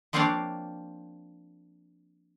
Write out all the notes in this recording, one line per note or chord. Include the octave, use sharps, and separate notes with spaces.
F3 A#3 C4 D4 C#5 D5